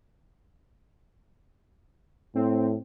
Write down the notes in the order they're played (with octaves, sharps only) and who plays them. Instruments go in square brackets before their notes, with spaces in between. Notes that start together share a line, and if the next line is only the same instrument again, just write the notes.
[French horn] A2 [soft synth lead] C4